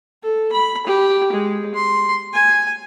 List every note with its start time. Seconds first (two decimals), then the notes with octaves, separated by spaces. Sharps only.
0.23 A4
0.52 B5
0.87 G4
1.33 G#3
1.75 C6
2.33 G#5